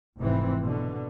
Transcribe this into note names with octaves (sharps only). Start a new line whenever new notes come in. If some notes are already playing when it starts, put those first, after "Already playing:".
F1 G#2 E3 C4
B2 D3